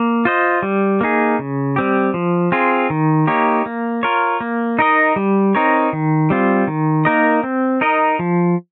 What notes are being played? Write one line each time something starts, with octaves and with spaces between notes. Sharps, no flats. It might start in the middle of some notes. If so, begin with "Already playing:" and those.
Already playing: A#3
F4 C5 D#5
G3
A#3 D#4 G#4
C#3
G3 C4 G4
F3
C4 F4 G#4
D#3
A#3 D#4 G4 C#5
A#3
F4 A#4 C#5
A#3
D#4 A#4 D#5
G3
C4 D#4 A#4 C#5
D#3
G3 C4 F4
D#3
A#3 D#4 A#4 D#5
C4
D#4 A#4 D#5
F3